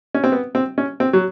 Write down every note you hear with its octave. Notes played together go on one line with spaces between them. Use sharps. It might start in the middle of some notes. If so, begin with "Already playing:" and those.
C#4
C4
B3
C4
C#4
C4
F#3